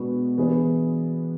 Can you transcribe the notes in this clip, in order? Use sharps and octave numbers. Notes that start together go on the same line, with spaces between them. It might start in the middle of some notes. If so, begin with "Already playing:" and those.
Already playing: B2 G#3 B3 D4 F#4
E3 B3 D4 G#4 B4